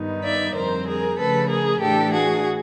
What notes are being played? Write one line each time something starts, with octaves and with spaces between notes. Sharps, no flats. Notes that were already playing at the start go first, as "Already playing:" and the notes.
Already playing: G2 D#3 G3 B3 D#4
D5 E5
F2 D3 G3 C4 A#4 C5
G#4 A#4
C#3 F3 A3 A4 B4
G#4 A#4
A2 E3 A3 D4 G4 A4
F#4 G#4